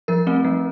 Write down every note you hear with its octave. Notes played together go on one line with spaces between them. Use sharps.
F3 A#4
A3 C4
F3